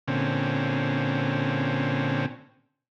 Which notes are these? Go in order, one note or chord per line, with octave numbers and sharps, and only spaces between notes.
A#2 D3 C4 C#4